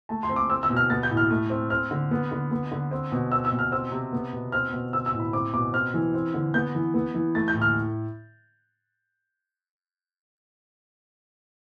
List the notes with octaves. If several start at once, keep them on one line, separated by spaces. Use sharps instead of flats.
A3 A5
C6
C4
D6
C4 E6
E6
B2
F6
B3 A6
G6
A2
F6
A3
C4
C4 F6
D3
B3
D3
B3
D3
C4
B2
C4 E6
E6
B2
F6
C4 E6
C3
B3
B2
C4 F6
B2
C4 E6
E6
A2
B5
C4 D6
B2 D6
C4 F6
E3
C4
D3
B3 G6
E3
B3
E3
A3 A6
G6
A2
F6